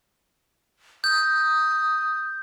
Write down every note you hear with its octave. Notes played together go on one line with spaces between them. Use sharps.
D#6 G6